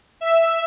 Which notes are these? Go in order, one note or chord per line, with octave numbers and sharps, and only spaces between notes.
E5